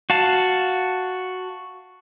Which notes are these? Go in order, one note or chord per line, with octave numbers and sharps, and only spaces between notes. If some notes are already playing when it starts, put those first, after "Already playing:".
F#4 F5 A5